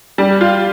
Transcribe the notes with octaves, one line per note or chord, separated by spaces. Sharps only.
G3
F4